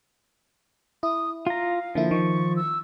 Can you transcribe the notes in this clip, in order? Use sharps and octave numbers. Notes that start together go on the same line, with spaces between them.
E4 D#6
F4 F5 A#5
D3 F3 A#3 E4
D#3 C#6
E6